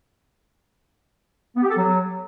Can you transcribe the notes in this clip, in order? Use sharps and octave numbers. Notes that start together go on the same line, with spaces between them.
B3
G4
A4
F#3